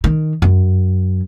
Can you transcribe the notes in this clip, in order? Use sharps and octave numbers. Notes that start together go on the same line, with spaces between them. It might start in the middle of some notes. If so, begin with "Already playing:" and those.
D#3
F#2